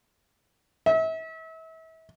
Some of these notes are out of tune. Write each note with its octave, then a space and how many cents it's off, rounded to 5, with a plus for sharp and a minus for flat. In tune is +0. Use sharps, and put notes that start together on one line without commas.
E5 -35